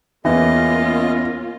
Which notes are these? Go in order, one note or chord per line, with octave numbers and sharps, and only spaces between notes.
E2 E3 A#3 C#4 F4 D#5